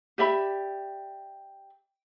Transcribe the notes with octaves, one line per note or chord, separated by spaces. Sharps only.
G4 D5 E5 B5